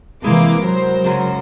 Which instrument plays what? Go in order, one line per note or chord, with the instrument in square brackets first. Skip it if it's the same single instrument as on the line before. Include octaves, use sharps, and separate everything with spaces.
[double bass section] C3 E3 [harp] G#3 E4 G#4 [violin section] A#3 D6
[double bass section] F#3 [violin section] A#4 C5
[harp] F#2 C#3